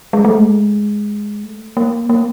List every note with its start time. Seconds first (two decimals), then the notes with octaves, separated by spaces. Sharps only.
0.13 G#3
0.25 A3
0.37 G#3
1.44 A3
1.77 A#3
2.09 A#3